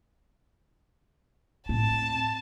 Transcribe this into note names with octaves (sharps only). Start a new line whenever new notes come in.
A2 C4 A5